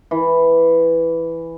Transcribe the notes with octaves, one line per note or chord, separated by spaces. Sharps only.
E3